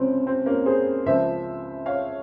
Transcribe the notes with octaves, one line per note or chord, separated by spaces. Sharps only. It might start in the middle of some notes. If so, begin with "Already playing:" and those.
Already playing: C#2 C3 F3 C4 C#4
C4
A#3 C#4
G#4 C5
C#2 C#3 F3 C5 E5
C#5 F5